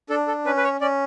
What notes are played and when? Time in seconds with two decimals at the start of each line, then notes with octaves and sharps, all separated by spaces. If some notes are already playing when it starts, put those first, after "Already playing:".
0.09 D4 A4
0.27 A4
0.45 C#4 B4
0.57 B4
0.64 C#5
0.81 C#4 D5